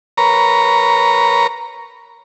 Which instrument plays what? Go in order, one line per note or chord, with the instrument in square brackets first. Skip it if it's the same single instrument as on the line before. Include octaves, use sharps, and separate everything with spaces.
[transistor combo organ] A#4 B4 C#5 A#5